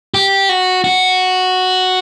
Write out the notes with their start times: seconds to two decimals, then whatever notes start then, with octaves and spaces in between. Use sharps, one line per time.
0.14 G4
0.49 F#4
0.84 F#4